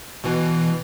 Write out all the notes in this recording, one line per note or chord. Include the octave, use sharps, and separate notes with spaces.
B2 E3